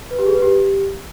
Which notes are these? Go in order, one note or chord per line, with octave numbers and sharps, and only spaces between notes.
B4
G4
G#4
B4
G4